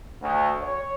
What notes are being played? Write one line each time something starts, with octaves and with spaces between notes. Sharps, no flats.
D2
C#5